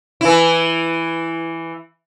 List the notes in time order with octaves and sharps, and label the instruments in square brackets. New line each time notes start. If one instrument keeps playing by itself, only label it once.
[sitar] E3 E4